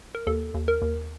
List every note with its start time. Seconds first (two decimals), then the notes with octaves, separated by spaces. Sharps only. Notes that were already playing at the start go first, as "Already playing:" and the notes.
0.15 A#4
0.27 D#2 A4
0.54 D#2
0.68 A#4
0.82 D#2